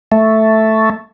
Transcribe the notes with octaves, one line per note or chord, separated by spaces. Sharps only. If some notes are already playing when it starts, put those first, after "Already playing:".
A3